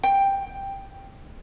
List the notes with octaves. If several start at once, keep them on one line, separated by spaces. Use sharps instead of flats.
G5